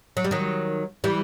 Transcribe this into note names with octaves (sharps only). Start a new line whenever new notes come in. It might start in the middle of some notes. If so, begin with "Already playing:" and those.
F#3
G3
D#3 F#3
E3 G3